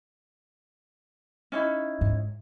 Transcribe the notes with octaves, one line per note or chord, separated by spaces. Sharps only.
C#4 D#4 E4
G#2